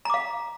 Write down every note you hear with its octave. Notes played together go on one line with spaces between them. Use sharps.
F5 A#5 D6